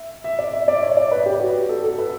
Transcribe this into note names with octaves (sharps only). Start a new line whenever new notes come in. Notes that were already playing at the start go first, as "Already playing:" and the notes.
Already playing: E5
E5
D5
E5
D5
C#5
D5
B4
G4
F#4
A4
A4
B4